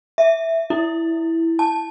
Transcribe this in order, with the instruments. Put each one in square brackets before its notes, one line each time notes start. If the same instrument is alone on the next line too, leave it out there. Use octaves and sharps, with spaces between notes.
[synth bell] E5
E4
A5